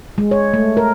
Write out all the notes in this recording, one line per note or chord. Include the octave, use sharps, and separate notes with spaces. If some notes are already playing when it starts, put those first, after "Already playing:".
G#3
C#5
A3
A#4